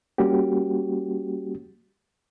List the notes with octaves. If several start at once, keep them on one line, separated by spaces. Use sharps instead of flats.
G3 A#3 C#4 F#4 G4